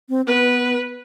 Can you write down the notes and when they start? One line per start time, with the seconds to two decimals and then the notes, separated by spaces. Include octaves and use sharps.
0.09 C4
0.27 B3 B4